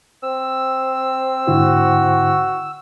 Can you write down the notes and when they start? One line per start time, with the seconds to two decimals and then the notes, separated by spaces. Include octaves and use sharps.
0.23 C4 E6
1.48 G#2 D3 E4 F#4